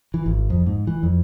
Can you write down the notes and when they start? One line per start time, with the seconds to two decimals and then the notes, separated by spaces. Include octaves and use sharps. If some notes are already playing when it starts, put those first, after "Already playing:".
0.14 E3
0.26 G#1
0.50 F2
0.66 G#2
0.87 E3
1.03 F2